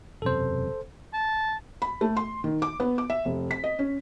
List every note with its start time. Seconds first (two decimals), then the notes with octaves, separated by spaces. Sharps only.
0.22 E1 F#2 C3 A4 C5
1.13 A5
1.82 B5
2.01 A3
2.17 C6
2.44 D#3
2.62 D6
2.80 B3
2.98 D6
3.10 E5
3.25 F1
3.51 B6
3.64 D#5
3.79 C#4